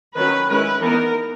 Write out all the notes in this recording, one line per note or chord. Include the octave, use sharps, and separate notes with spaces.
D#3 F#3 C#4 B4
D#3 G#3 C#4 E4 B4
E3 B3 D#4 A#4